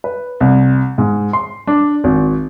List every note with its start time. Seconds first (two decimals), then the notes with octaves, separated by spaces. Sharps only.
0.04 B4
0.40 C2
0.98 G#2
1.33 C6
1.67 D4
2.04 G#1